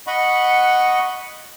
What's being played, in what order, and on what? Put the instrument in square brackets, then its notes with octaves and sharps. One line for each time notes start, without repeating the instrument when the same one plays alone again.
[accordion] D#5 F#5 B5 C#6